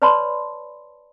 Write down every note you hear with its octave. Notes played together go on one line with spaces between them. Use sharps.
B4 C#5 D5 A5 B5 C6